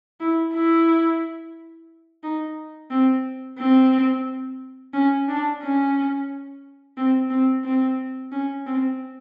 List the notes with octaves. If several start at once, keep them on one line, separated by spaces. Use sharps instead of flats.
E4
E4
D#4
C4
C4
C#4
D4
C#4
C4
C4
C4
C#4
C4